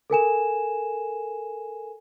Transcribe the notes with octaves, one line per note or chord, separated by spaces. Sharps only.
A4 A#4 G#5 E7